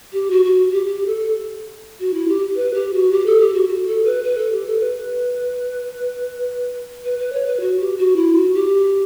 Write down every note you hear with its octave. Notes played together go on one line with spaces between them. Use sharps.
G4
F#4
F#4
G4
G4
A4
F#4
E4
G4
B4
G4
F#4
G4
A4
G4
F#4
F#4
A4
B4
B4
A4
G4
A4
B4
B4
B4
C#5
B4
F#4
G4
F#4
E4
F#4
G4